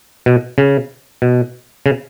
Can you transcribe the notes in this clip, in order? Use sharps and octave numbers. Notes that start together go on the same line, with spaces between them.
B2
C#3
B2
C#3